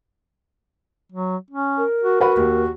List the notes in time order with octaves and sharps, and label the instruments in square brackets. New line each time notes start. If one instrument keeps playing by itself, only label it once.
[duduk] F#3
C#4
[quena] A#4
[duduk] F#4
[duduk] F#4 [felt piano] B4 F#5 B5
[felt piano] D#2